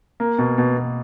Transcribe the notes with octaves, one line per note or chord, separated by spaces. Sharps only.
A#3
B2
B2
B2